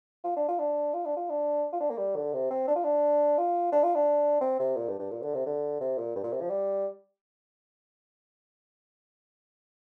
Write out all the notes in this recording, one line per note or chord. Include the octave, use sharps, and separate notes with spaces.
F4
D4
F4
D4
F4
D4
F4
D4
F4
D4
A#3
G3
D3
C3
C4
D4
F4
D4
F4
D4
F4
D4
C4
C3
A#2
G2
G2
A#2
D3
C3
D3
C3
A#2
G2
A#2
C3
F3
G3